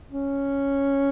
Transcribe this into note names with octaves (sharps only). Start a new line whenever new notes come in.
C#4